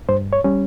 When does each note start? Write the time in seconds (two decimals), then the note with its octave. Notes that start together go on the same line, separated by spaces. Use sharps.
0.09 G2 C5
0.33 C#5
0.44 G3 C#4